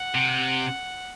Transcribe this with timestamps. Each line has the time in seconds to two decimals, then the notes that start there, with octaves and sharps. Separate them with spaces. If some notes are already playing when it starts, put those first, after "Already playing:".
Already playing: F#5
0.15 C3